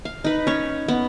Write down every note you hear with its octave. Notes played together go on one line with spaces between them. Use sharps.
F5
D#4 B4
C#4 C#5
B3